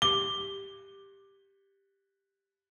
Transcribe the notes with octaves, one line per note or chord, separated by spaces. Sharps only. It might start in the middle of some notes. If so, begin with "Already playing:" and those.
G4 D6 G7